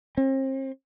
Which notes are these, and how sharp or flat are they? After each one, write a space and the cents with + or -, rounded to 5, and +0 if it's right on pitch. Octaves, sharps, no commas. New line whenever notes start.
C4 +40